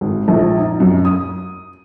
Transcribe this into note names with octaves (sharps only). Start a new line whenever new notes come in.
G#1
A#1
D#4
F#2
D#6